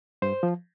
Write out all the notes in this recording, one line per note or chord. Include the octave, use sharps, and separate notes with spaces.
G2 C5
F3